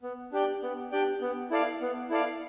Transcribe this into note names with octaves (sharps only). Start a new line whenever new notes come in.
B3
D4 G4 D5 G5
B3
D4 G4 D5 G5
B3
E4 A4 D5 F5
B3
E4 A4 D5 F5